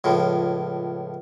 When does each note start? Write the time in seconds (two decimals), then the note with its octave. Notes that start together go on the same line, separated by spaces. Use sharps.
0.04 C#2 A2 F3